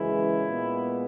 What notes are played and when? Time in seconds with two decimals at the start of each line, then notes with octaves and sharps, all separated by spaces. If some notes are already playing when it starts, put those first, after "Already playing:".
Already playing: F#2 C#3 E3 G#3 E4
0.46 A#2 G#3 B3